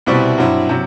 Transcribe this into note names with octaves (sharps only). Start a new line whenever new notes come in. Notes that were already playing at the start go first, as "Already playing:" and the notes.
C2 B2 G3 C4 E4
G2 F#3 C4 E4
C3 F#3